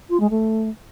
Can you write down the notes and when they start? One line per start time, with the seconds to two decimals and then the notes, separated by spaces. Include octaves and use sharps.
0.09 F4
0.20 G#3
0.30 A3